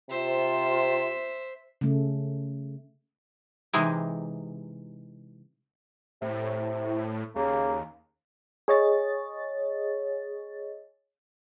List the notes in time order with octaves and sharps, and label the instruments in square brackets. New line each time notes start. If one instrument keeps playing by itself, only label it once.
[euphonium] C3 [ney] F4 [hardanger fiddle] C5 E5
[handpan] C#3 A3
[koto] C3 E3 G#3 D#4 E4
[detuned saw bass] A2 [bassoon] C3
[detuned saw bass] D#2 [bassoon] C#3 [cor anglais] A#3
[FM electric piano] G#4 C#5 D#5 A6